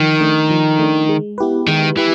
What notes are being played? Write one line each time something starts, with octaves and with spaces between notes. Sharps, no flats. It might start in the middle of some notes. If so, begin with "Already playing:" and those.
Already playing: D#3 F3
A3 D4
F3
A3 D4
G#3
B3 E4 G4 B4
D#3 G#3
E3 G4 B4